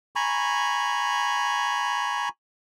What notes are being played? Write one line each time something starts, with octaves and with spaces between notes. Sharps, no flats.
G#5 A#5 B5 C#6